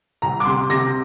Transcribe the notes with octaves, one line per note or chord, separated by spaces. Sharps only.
C2 A#5
D6
C3 C6
C3 A#6